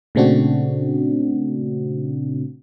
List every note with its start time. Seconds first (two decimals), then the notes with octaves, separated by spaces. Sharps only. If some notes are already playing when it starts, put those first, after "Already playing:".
0.15 A#2 C#3 A3 C4 D4 F#4